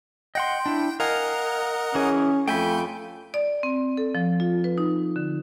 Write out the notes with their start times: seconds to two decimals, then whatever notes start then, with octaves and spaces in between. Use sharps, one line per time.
0.35 D#5 F#5 G5 C6
0.66 D4 E4
1.00 A#4 D#5 F5 F#5 G#5
1.95 E3 C#4 G#4
2.48 F2 A3 G5 G#5 B5 G6
3.34 D5
3.63 C4
3.97 A4
4.15 F3
4.40 F4
4.64 B4
4.78 D#4
5.16 D3